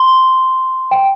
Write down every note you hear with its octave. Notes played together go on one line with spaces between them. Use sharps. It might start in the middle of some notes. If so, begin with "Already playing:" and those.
Already playing: C6
G5